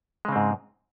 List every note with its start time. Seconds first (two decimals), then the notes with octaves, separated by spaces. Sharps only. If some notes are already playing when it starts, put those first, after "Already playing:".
0.25 G#3
0.29 C#3
0.32 C4
0.36 G#2